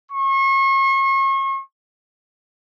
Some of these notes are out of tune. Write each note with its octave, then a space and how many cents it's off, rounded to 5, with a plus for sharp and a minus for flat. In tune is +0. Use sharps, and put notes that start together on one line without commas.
C#6 -40